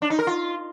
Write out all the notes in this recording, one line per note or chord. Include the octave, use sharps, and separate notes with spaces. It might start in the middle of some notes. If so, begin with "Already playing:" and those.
D4
D#4
A#4
F4